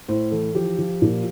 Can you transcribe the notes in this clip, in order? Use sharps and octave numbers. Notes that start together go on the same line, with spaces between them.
A2 C5
E3 A4
F3 G4
F3
A#2